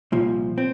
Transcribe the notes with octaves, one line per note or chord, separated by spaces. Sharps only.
C2 A#2 F3
C4